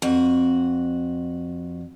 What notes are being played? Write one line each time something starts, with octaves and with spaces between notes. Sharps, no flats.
F2 F#4